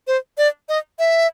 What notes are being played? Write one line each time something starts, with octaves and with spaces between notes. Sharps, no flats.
C5
D5
D#5
E5